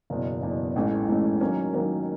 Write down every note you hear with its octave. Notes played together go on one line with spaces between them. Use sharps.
F#1 E2 B2
F#1 E2 B2
A1 G#2 E3 A3 C#4
A1 G#2 E3 A3 C#4
D#3 F#3 A#3 C#4
D#3 F#3 A#3 C#4